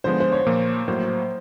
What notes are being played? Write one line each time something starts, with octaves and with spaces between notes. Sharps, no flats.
D3 F3 G#3 B3 C5
C5
C#5
A#2 F3 A#3
A2 F#3 A#3 C5